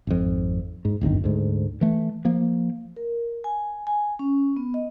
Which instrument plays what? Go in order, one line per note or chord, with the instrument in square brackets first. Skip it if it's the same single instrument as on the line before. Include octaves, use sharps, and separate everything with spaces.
[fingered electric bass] G#1 F2
G#2
D1 G1 F#2 D#3
D2 G#2
E3 A3
F3 A#3
[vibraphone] A#4
G#5
G#5
C#4
B3
D#5